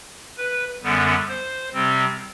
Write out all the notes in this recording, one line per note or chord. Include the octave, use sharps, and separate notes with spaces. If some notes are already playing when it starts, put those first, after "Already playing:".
B4
F#2 D3 G3 B3
C5
C3 G3 C4